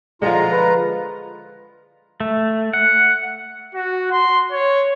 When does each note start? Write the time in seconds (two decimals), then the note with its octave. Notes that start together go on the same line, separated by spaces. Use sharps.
0.22 D3 F3 G#3 F4 A#5
0.52 B4
2.20 A3
2.73 F#5
3.75 F#4
4.11 C6
4.52 C#5